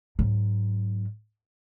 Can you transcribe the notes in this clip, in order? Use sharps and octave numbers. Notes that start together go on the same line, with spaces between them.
G#2 F#3